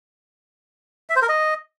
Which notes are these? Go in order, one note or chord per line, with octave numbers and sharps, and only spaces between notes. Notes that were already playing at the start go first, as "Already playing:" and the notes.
E5
C5
A#4
D#5